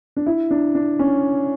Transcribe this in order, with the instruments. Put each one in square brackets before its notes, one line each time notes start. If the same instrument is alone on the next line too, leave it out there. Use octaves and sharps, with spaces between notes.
[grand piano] D4
E4
D4
D4
C#4